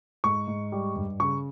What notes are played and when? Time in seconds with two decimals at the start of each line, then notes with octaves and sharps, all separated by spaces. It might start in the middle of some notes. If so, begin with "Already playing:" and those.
0.24 G#2 C#6
0.48 G#2
0.72 G3
0.96 G2
1.20 C#3 C#6